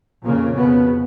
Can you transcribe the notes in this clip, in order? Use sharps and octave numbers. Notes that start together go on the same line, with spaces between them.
F2 A#2 C#3 A#3
B2 B3